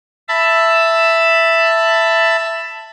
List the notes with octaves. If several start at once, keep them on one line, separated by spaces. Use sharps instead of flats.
E5 A5 B5